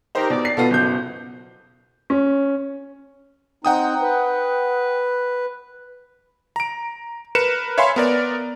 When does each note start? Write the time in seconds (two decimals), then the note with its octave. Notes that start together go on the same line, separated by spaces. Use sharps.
0.15 D#4 G4 A#4 C5
0.30 B2 D5
0.45 C7
0.57 B2 B3 F4 A4
0.70 F#1 G6
2.10 C#4
3.65 C4 D#4 F#5 G5 D#6
4.02 B4
6.56 A#5 D7
7.35 A#4 B4 C#7 E7
7.78 C#5 E5 F5 G#5 B5 C6
7.96 B3 A#4 D5